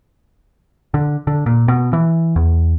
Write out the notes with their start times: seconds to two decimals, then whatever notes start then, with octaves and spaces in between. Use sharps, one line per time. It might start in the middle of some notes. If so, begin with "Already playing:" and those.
0.94 D3
1.27 D3
1.46 A#2
1.68 B2
1.93 E3
2.36 E2